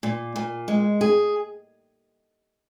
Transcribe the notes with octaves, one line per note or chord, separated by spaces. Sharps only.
A#2
A#2
G#3
G#4